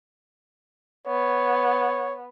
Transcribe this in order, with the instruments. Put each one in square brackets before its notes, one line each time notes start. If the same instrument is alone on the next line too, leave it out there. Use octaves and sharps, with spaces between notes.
[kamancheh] B3 [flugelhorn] C#5